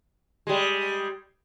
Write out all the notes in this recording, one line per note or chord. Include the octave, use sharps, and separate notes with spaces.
G3 G#3